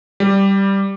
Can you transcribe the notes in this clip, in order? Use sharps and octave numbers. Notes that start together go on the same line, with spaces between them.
G3